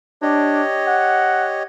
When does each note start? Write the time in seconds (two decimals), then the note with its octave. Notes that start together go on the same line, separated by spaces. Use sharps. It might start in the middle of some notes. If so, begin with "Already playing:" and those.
0.22 D4 G4 C#5 D#5
0.87 F#5